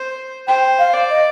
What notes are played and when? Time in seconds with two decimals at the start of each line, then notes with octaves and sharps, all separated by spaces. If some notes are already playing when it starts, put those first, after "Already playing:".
Already playing: C5
0.48 C5 G5
0.79 F5
0.94 D5
1.10 D#5